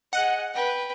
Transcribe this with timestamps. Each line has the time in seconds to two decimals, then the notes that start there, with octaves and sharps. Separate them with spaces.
0.13 G#4 D#5 F#5
0.54 B4 G5